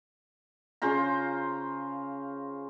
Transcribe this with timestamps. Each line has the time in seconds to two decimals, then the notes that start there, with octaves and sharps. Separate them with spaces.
0.82 C#3 F4 C5 A#5